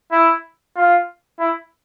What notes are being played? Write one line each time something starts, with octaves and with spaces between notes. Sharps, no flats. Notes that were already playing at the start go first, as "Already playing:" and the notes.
E4
F4
E4